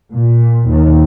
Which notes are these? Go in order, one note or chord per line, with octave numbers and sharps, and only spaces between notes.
A#2
D#2